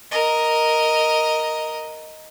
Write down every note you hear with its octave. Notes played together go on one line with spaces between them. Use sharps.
A#4 D#5